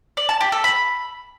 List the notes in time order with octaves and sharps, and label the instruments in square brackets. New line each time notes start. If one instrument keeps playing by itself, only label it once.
[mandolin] D5
A5
G4
A4
B5